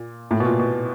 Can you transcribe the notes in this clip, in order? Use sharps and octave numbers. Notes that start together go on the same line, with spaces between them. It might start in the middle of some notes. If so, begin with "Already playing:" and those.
Already playing: A#2
A2
B2
A#2
B2